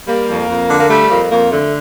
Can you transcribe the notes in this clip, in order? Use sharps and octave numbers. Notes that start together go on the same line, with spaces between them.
G3 A#3
F2
F2
D3
A#3
G3 A3
F2 A#3
F2 A#3
D3 A3